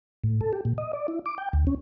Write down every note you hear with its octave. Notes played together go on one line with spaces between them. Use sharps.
A2
A4
G4
A#2
D#5
D5
E4
D6
G5
D2
C#4